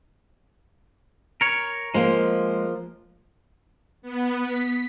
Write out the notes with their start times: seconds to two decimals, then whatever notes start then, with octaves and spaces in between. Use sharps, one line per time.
1.41 A#4 C#5
1.94 F3 G#3 A#3
4.02 B3
4.43 B6